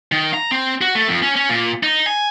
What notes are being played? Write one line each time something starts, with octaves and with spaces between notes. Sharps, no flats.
D#3
A#5
C4
F#4
A3
F2
C#4
C#4
A#2
D#4
G#5